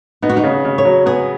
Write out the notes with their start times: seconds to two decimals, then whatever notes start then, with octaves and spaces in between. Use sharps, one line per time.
0.22 B3 D#4
0.30 F#4
0.37 D#4
0.44 C#3
0.65 C#3
0.78 C#5
0.85 F#3
1.06 B3 G#4